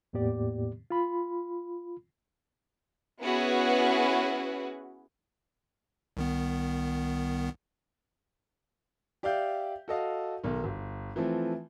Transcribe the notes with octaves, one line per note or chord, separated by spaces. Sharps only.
E2 A2 A#3 B3 G4 D5
F4 B5
B3 C#4 E4 F#4 G#4 B4
C2 D#3 B3
G4 D5 E5 F5 G6
F#4 A4 D#5 F5
B1 D#3
G1
E3 F3 A3 C4